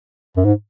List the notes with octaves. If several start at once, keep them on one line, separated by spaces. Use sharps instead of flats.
F#2
G#2